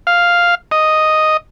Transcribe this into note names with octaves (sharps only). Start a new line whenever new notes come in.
F5
D#5